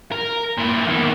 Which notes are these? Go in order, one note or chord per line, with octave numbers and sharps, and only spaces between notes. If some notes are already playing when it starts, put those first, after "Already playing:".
A#4
A#2 E4
E2 D#3